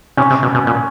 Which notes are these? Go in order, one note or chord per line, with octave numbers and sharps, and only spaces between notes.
C3 C#4
C3
B2
B2
A#2